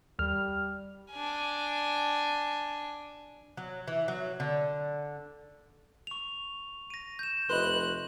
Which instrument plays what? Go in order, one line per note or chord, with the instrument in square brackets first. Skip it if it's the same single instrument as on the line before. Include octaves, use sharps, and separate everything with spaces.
[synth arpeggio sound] D#2 [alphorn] G3 [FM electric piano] F6
[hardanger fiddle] D4 G#5
[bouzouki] F#3
E3
F#3
D3
[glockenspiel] C#6 F7
A#6 D#7
G6 E7
[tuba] F1 [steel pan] B4 D#5 [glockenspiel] C6 [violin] F#6